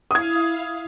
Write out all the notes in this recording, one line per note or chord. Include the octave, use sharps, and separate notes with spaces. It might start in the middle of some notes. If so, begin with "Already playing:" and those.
E4 F5 D#6 G#6